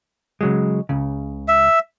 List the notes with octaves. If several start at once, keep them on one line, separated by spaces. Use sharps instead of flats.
C#3 F#3 G#3
C#2 C#3
E5